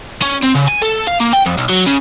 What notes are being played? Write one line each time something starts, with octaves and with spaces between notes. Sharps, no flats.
C#4
C4
C#3
G#5
A4
F5
A#3
G5
F2
B1
F#3
C#3